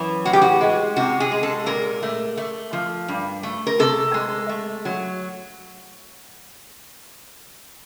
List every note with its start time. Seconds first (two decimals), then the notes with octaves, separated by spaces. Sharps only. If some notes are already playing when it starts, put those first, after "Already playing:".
Already playing: F#2 E3
0.25 A2 F#4
0.33 G4
0.41 F#4
0.61 G#3
0.96 C3 F#4
1.20 G#4
1.31 G#3
1.43 A4
1.66 A#2 A#4
2.03 A3
2.37 A3
2.73 F3
3.08 G2
3.43 A3
3.67 A#4
3.79 C3 A4
4.14 G#3
4.49 A3
4.85 F#3